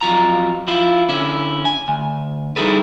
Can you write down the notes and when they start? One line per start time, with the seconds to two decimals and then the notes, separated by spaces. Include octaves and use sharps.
0.01 F2 F#3 F4 A#5
0.68 F3 E4 F4
1.09 D3 C#4 E4
1.65 G#5
1.88 D2
2.56 G3 D#4 E4 G#4 A4 B4